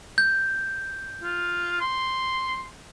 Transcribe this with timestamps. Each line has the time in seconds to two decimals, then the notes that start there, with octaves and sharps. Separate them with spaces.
0.18 G6
1.23 F4
1.81 C6